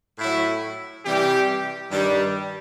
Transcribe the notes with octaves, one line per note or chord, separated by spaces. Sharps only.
A2 F#3 E4
C3 E3 G3 G4
G2 D#3 G3